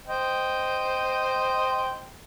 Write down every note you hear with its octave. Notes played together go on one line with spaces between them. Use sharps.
C5 D#5 G5